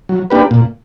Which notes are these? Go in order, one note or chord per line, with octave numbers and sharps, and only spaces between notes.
F#3
A#3 D4 G4 B4
A#2